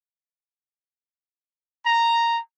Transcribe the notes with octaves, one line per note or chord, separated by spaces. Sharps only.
A#5